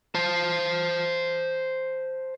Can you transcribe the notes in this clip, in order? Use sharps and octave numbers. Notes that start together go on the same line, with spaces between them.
C5 A5